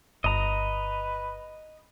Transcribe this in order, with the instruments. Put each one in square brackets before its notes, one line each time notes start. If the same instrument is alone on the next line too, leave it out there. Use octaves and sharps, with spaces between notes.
[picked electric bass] G1 [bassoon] B4 [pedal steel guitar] D#5 A#5